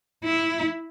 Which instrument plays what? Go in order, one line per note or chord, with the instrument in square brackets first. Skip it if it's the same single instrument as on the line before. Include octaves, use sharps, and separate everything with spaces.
[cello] E4